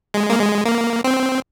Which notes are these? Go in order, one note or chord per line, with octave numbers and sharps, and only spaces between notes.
G#3
A#3
G#3
A#3
C4